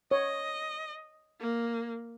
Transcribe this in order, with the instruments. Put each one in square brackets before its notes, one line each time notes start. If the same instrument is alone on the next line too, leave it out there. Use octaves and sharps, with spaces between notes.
[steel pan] C#5 [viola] D#5
[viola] A#3